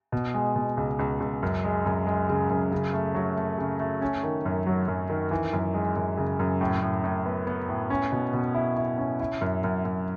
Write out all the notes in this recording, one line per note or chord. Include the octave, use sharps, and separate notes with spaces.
B2
G#3
B2
C#2
C#2
C#2
F#2
G#3
F#2
G#3
C#3
F#2
C#3
A3
F#3
A3
C#3
A3
C#4
D#3
F#2
F#3
F#2
D#3
E3
F#2
G#3
F#2
C#3
F#2
A2
A2
A2
B3
B3
A2
C#4
B2
B2
E4
E4
C#4
E4
F#2
F#2
F#2